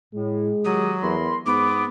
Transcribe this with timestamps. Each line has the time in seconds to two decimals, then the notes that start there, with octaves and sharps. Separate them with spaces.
0.14 A2 G#3
0.65 D#3 F#3 G4 D#6
1.03 E2 A#4 B5 C6
1.46 G#2 B3 D6